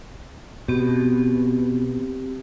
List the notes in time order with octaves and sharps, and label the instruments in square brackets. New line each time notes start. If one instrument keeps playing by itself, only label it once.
[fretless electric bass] B2 [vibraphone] C4 G4